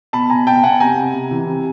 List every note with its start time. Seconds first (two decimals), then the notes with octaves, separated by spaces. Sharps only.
0.13 B2 A5 B5
0.30 B2 G#5 A#5
0.47 B2 G5 A5
0.63 B2 F#5 G#5
0.80 C3 G#5 A#5
0.97 C3
1.14 C3
1.31 E3
1.47 C3